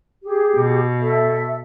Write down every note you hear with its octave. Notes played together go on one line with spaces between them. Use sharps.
G4 G#4
B2
A4 E5